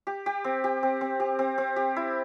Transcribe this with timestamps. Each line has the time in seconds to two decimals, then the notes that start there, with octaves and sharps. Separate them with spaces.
0.07 G4
0.26 G4
0.44 C4
0.64 G4
0.83 C4
1.01 C4
1.20 G4
1.39 C4
1.58 C4
1.76 G4
1.96 E4